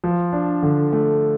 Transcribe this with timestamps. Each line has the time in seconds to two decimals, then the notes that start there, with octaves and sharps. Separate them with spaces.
0.04 F3
0.33 D4
0.62 D3
0.92 A3